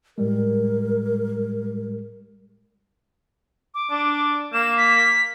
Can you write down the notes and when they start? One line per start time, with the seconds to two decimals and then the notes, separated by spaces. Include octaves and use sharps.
0.18 A2 G3 G#3 A#4
3.74 D6
3.91 D4
4.53 A#3 E7
4.78 B6